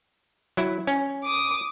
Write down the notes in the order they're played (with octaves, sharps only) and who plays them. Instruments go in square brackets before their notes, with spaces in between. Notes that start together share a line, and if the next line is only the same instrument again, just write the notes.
[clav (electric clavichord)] F#3 E4
C#4
[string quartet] D6 D#6